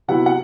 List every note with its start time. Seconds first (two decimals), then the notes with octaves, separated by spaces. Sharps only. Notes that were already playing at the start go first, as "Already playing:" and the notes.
0.08 C3 F#3 B3 E4 F#5
0.26 F#5